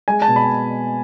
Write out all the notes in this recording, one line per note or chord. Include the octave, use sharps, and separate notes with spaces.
G#3 G#5
A5
B2
B5